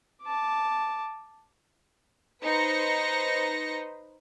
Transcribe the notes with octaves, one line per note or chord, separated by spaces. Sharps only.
A5 D6
D#4 B4 C5 A#6 C#7